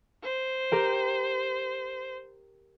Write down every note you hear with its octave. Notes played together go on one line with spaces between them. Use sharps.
C5
G4 A#4 G5